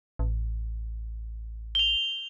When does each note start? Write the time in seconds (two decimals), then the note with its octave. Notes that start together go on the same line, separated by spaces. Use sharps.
0.19 A1
1.75 F7 G7